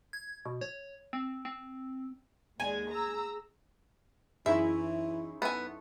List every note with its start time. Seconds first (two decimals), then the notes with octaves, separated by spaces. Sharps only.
0.13 G#6
0.45 B2
0.61 C#5
1.13 C4
1.45 C4
2.60 D#2 G#3 G#4 G#5
2.90 A#5 E6
4.46 F#2 E3 D#4 E4 G#4 C#5 E5 C6
5.42 B3 A4 G#5